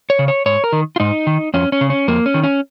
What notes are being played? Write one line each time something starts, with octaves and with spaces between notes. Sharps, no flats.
C#5
C#3
C#5
G#2 C#5
A#4
D#3
F4
G#2 D#4
D#3
F2 C#4
C#4
C#3
C#4
F2 A#3
C#4
D#3
C#4